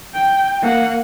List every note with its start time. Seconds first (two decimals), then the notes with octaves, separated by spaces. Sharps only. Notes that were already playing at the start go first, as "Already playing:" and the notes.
0.14 G5
0.63 A#3 F#5